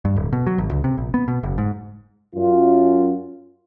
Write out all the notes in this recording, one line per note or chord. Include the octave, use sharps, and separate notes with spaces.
G2
D1
B2
F#3
G#1
C#2
C3
A#1
B3
B2
F#1
G#2
F#2 F4